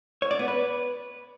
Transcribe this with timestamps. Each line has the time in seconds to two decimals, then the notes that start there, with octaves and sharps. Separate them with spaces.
0.22 C#5
0.31 D5
0.39 B3
0.48 B4